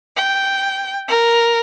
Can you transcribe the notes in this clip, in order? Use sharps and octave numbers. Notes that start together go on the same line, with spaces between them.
G5
A#4